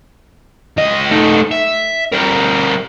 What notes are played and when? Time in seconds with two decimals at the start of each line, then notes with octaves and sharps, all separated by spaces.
0.77 C#2 D#5
1.11 A3 D#4
1.51 E5
2.13 G3 A#4